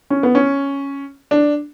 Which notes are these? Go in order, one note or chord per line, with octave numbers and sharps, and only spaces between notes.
C#4
B3
C#4
D4